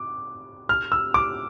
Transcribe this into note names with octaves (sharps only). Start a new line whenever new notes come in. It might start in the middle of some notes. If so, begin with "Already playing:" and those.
Already playing: D6
F6
E6
D6